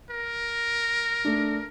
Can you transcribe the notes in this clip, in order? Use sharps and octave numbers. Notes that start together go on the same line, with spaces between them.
A#4
A3 D4